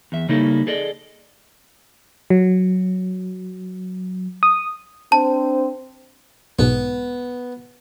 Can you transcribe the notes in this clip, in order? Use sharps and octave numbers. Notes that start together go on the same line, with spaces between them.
E2 E5
C#3 G3 A#3 D#4 E4 A4
G#4 A4 D5 D#5
F#3
D#6
C4 D4 C5 A5
B1 G#2 B2 B3